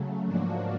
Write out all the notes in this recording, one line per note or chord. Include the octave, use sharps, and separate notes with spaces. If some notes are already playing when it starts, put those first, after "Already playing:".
Already playing: C#3 F#3 A3
G#2 F3 A#3 D4 F#4